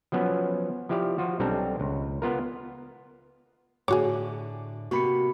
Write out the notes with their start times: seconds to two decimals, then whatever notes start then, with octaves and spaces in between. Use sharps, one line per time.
0.12 F3 F#3 B3 C#4
0.89 F3 E4 G4 D5 F5
1.18 F3 F4 F#4
1.40 B1 G3 C4 D4 A4 A#5
1.80 C#2
2.22 B3 F4 A#4
3.88 A2 D3 F#4 G#4 C#5 D6
4.91 C3 A#3 B3 F#4 B5 C#7